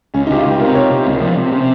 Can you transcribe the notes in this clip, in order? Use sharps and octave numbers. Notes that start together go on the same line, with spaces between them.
C#2 C#4
D#4
C#2 G4
F4
C#2 G4
C3 A#4
C3 C#5
C3
C#2
F3
C3
C3 C#4